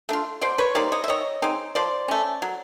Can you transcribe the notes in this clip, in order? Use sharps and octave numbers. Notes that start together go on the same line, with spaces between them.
A3 D4 F4
B2 C5 D5
B4 C#5
G3 A#3 D#4 C5 D5
C#5 D#5
E5
D#3 C#5 D#5
G#3 C4 D#4
F3 C5 D5
A3 C#4
F#3